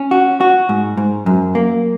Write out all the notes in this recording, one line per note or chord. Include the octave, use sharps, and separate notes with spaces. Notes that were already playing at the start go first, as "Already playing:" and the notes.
Already playing: C#4
F#4
F#4
G#2
G#2
F#2
A#3